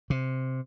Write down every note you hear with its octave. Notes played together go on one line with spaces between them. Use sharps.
C3